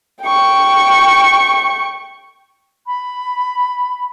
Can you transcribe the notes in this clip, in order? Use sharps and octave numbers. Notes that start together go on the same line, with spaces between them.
G5 C#6
B5